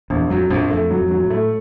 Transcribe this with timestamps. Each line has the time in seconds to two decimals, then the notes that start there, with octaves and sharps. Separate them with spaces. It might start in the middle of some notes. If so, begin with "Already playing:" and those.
0.10 A#1 E2
0.30 F2 F#3
0.50 A#1 F2
0.70 F2 A3
0.91 F#3
0.98 F2
1.11 F#3
1.24 A2
1.30 A3